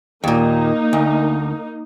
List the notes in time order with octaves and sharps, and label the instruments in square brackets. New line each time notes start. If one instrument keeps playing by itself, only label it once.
[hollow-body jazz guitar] D#2 A#2 [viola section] A#3 D#4
[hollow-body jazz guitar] D2